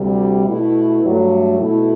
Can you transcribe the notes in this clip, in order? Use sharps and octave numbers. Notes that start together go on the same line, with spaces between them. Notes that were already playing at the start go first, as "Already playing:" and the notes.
Already playing: D2 C3 G3
B2 A3 E4
G2 F#3 A3
B2 A3 E4